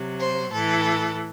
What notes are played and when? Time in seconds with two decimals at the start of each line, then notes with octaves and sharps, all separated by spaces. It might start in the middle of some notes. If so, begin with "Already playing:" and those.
Already playing: C3 F#3
0.19 C5
0.51 A2 E3 A4